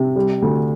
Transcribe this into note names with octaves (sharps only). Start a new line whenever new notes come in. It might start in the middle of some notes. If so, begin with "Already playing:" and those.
Already playing: C3
G3
D2